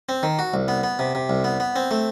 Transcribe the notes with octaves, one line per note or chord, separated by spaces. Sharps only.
C4
D#3
F#4
C2
B3
B3
C3
C3
C2
B3
B3
C4
A3